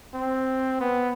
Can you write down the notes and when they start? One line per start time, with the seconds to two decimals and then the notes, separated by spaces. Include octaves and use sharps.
0.14 C4
0.81 B3